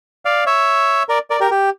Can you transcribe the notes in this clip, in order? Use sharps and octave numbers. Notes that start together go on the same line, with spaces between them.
D5 F5
C#5 E5
A#4 D5
A#4 D5
G4 A#4
G4